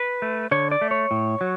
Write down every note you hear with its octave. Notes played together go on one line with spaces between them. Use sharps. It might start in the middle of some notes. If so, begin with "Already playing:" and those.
Already playing: B4
A3
D3 C#5
D5
A3
C#5
A2
F#3